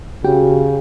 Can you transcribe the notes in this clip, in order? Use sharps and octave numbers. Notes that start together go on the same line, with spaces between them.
C#3 F#4 G4 G5